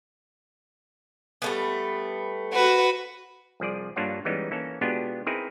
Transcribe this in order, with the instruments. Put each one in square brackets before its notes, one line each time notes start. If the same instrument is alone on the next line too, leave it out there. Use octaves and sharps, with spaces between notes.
[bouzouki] G3 A3 B3
[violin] F#4 B4
[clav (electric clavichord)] C2 F3 G#4 D5
G2 A#3 D4 F4 C#5 F#5
E3 G3 G#3 B3 C#4 D#4
E3 A#3 C#4 A4
B2 G#3 B3 D4 F4 G4
C4 D#4 E4 G#4 A#4 B4